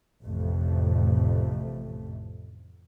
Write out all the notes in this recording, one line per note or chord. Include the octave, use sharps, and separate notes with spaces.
A1 F2 C3 A3